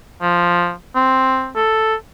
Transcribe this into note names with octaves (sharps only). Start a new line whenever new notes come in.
F3
C4
A4